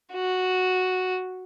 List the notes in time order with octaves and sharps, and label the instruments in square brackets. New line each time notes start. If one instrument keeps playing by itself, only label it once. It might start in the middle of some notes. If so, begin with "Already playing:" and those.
[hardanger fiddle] F#4